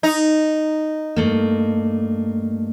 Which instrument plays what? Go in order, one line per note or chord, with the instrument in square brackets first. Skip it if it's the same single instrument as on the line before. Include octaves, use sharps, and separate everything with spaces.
[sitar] D#4
[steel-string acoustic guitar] G2 A3 A#3